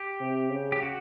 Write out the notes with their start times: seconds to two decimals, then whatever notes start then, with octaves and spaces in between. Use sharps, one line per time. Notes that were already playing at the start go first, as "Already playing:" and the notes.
Already playing: G4
0.21 C3
0.51 C#3
0.72 G4
0.83 F#4